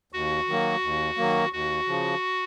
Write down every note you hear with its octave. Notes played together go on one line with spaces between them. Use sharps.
D#2 F#4
D#3 F#3 A#3
D#2
D#3 F#3 A#3
D#2 F#4
C#3 F3